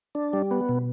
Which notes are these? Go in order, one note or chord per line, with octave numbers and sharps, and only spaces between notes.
D4
G3
B3
B2